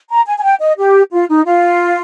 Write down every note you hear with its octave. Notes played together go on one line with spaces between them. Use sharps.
A#5
G#5
G#5
G5
D#5
G4
F4
D#4
F4